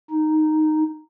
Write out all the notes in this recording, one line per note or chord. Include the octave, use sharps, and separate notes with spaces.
D#4